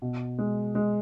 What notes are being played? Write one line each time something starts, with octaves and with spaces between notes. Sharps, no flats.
B2
G#3
G#3